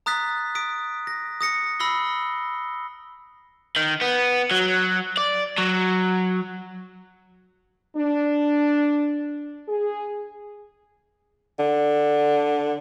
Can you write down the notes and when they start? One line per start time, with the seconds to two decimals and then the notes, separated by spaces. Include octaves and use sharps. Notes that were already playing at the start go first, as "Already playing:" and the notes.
0.06 A#5 D#6 F#6 A6 B6
0.55 D#6 B6 D7
1.07 A#6
1.41 D#6 A#6 C#7
1.80 B5 E6 A#6 C7 G7
3.76 D#3
4.01 B3
4.51 F#3
5.17 D5
5.58 F#3
7.96 D4
9.68 G#4
11.59 D3